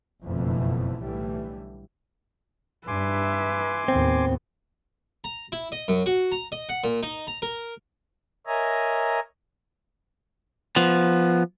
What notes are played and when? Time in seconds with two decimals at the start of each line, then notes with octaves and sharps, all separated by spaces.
0.23 F#1 F2 B2 D3 E3 A3
1.02 B1 A2 D3 E3 G3 A3
2.87 G2 B4 E5 G#5 C6 D6
3.88 D#2 A2 B3 C4
5.24 A#5
5.52 E4
5.72 D#5
5.88 F#2
6.06 F#4
6.32 A#5
6.52 D#5
6.69 F#5
6.84 A#2
7.03 D#4
7.27 A#5
7.42 A#4
8.46 A#4 C#5 D#5 E5 G#5 A#5
10.76 F3 B3